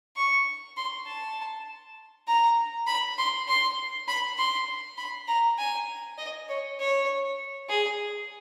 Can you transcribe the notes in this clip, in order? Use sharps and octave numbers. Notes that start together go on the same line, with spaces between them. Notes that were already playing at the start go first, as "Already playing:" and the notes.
C#6
C6
A5
A#5
B5
C6
C6
B5
C6
B5
A#5
G#5
D#5
C#5
C#5
G#4